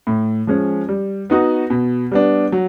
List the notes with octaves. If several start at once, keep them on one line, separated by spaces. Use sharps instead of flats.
A2
F3 G#3 C#4
G3
B3 D#4 F#4
B2
G3 B3 D4
F#3